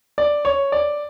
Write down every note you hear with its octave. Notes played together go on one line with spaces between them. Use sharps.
D5
C#5
D5